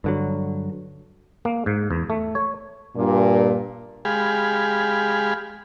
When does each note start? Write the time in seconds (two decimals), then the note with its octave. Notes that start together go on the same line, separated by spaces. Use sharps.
0.04 G2 D3 F#3
1.45 A#3
1.66 G#2
1.91 E2
2.10 A3
2.35 C#5
2.96 G2 A#2
4.05 G#3 G4 G#4 F5 B5